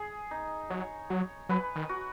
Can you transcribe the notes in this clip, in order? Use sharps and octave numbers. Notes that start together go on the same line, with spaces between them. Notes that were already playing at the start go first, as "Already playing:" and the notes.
Already playing: G#4
D#4
F#3 C#5
F#3 C#5
F#3 B4
D#3
F#4